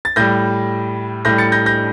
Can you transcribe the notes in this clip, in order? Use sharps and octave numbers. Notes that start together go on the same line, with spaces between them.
A6
A2 G3 G6 A#6
A2 G3 G6 A#6
A6 C#7
G6 A#6
G6 A#6